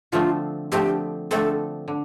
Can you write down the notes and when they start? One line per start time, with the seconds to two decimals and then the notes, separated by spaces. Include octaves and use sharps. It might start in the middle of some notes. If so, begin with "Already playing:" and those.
0.12 D3 F3 A3 C4 F4
0.72 D3 F3 A3 C4 G4
1.31 D3 F3 A3 C4 A4
1.88 D3